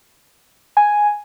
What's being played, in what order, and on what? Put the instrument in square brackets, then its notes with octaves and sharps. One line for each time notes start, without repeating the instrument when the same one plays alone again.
[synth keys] G#5